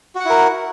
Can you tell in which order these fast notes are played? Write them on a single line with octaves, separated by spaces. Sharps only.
F#4 F#5 E4 A#4